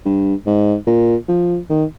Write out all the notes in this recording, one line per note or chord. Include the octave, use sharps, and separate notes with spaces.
G2
G#2
A#2
F3
D#3